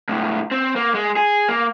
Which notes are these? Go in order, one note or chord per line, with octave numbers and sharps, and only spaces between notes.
C#2 A2
C4
A#3
G#3
G#4
A#3